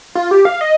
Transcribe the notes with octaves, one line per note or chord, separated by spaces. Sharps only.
F4
G4
F5
D#5